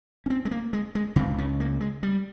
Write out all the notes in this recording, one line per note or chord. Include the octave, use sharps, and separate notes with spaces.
C#4
C4
G#3
A#3
G#3
G#3
C#2 C#3 C4
C#4
A#3
G#3
G3